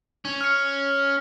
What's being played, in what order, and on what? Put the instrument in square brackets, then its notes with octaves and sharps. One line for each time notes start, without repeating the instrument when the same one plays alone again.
[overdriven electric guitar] C#4
[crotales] F6 C#7